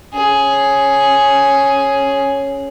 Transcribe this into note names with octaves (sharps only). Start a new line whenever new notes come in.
C#4 G#4